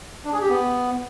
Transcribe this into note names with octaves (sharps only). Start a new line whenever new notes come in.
D4
G#4
G4
B3